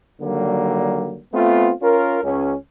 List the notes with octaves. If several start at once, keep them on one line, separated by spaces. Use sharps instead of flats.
D3 D#3 F#3 G3 A#3
A3 B3 C4 F4
C#4 F4 A#4
C#2 C#4